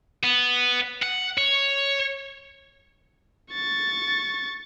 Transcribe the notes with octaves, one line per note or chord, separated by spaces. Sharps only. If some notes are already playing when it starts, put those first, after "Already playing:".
B3
F#5
C#5
C#6 A6